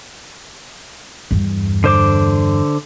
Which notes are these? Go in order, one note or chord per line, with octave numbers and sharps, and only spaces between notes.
E2 G2
D3 C5 D6